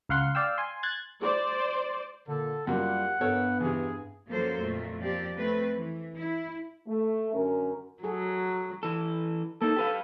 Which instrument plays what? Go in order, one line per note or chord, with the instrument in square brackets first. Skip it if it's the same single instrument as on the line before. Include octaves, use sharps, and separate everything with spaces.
[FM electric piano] C#2 F5 F#5 C6
D5 F5 G5 E6
G#5 C6
F#6 G#6 A6
[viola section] C5 D5
[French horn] A#2 [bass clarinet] D3 [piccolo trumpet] A4
[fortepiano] F#2 A#3 [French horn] G3 [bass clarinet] F4 [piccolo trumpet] F#5
[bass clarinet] G2 [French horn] B3 [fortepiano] A4 A#4 C#5
[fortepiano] E2 C3 [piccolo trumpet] G#4
[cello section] F#2 F3 F#3 A#3 A4 C5
F2 A#2 A3
F3 A#3 C4 G4 D5
A3 C4 B4
E3
E4
[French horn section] A3
F#2 D3 C#4 A#4
[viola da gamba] F#3 [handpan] F#4 G#4 A4
[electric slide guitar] E3 A4
[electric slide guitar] A#3 D#4 [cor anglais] A4
[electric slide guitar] G4 B4 F5